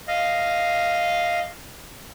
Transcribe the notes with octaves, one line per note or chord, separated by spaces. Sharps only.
D#5 F5